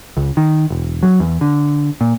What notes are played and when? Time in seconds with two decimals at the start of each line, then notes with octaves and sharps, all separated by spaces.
0.17 C#2
0.37 D#3
0.70 E1
1.03 F#3
1.20 E2
1.41 D3
2.01 A#2